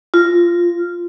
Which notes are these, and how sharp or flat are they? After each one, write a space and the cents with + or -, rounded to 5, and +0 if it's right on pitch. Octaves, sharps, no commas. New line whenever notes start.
F4 -10